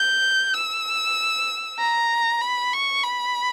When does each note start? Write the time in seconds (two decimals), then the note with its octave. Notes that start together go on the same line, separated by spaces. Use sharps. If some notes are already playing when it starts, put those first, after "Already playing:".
Already playing: G6
0.54 E6
1.79 A#5
2.41 B5
2.73 C#6
3.04 B5